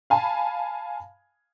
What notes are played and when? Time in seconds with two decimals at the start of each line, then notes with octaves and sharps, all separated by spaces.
0.10 F5 G#5 A5 B5